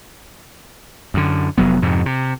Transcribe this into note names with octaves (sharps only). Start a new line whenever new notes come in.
F#2 D3
F1 F#3 B3
F2 G#2 C3
C3